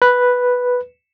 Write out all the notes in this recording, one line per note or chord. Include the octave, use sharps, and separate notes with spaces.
B4